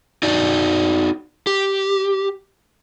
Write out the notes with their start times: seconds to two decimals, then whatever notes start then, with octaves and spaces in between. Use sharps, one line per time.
0.23 D#4 F#4 D5
1.47 G4